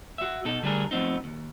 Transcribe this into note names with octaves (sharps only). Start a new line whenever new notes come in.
F#4 E5
B2 D#4 A4
D3 G3 A3 D4 G#4 A#4
F3 A3 B3 C4 D#4
D#2